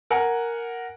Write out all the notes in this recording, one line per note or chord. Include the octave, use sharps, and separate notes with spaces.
A#4 F#5 G#5